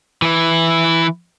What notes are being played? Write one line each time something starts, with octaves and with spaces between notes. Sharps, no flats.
E3 E4